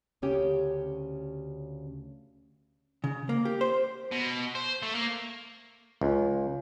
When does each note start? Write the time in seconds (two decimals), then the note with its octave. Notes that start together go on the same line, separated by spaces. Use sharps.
0.22 D2 C#3 C#4 G4
3.04 C#3
3.29 A#3
3.45 G4
3.61 C5
4.11 B2
4.55 C5
4.82 A3
4.94 A#3
6.01 C#2